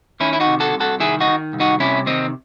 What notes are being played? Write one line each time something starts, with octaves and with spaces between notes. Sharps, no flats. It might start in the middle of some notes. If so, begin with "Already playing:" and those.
D#3 C#4 E4
E4
D#4 F#4
C3
F#4 A4
C2
F#4 A4
D#3 E4 G#4
D#4 F#4
D#3
C2
D#4 F#4
C3 C#4 E4
D#3 C4 D#4